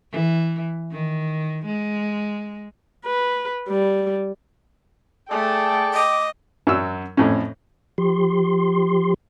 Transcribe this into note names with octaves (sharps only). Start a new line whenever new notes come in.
E3
D#3
G#3
B4
G3
A3 G#4 A4 D5 G5
D#5 D6
F#2 F#3 E6
F2 A2 C#4
F3 G4 C6